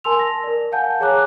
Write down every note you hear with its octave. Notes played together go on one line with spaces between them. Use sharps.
A#4 G#5 A5 C6 E6 F7
A#6
A#4 D5
F5 F#5 G#5 A5 G6
G#4 C#5 G#5 A#5 D6 F#6